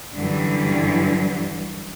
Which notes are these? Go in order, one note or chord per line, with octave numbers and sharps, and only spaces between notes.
F#2 D3 E3 G3